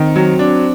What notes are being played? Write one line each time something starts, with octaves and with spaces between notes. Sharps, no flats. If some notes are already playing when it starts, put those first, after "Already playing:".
Already playing: D#3 C4
F#3
D4